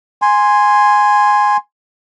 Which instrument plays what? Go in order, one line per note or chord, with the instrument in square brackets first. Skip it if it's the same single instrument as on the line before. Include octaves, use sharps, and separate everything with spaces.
[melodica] G#5 C6